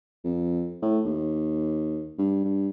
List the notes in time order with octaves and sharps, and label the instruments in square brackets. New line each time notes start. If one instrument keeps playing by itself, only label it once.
[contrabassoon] F2
A2
D#2
G2
G2